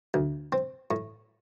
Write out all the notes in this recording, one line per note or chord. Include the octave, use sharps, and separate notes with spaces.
D2
C4
A2